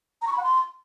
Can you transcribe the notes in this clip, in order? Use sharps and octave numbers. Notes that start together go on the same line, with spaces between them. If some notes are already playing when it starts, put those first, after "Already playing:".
A#5
C#6
B5
F#5
C6